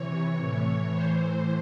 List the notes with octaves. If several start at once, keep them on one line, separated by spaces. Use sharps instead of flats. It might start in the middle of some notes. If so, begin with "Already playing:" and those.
Already playing: C3 E3 C#5
A2 E3
A2 E3 C5